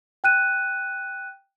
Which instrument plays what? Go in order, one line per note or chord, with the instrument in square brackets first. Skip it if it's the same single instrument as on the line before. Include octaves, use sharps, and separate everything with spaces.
[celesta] G5 F#6 D#7